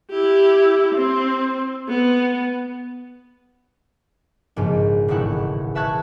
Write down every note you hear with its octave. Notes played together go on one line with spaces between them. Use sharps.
E4 G4
C4
B3
A#1 G#2 C#3
E1 A1 D#3 E4 F#5
B4 E5 A5 C#6 F#6 G#6